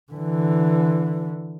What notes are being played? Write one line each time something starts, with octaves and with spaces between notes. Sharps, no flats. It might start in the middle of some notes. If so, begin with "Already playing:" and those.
D3 E3